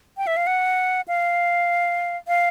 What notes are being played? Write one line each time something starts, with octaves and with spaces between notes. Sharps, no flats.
G5
E5
F5
F#5
F5
F5